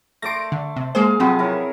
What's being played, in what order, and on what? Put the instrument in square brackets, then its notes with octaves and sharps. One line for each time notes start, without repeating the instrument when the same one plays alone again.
[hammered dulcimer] A3 D5 C6 [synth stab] A#6 D7
[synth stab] D3
C3
[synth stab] G#3 A#3 C5 [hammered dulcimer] G#4 F5
[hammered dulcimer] C3 F3 B3 [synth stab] F#3 C4
[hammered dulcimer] E4 A#4 C#5